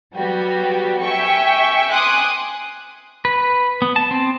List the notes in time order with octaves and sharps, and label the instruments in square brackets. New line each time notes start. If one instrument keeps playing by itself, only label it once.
[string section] F#3 G3 B3 F#4 G4
E5 G5 G#5 C#6
G#5 C6 D6 D#6 F#6
[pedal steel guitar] B4
B3
A5
C4